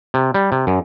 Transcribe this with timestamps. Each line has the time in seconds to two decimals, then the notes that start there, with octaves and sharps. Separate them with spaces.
0.14 C3
0.34 G3
0.52 C3
0.67 F#2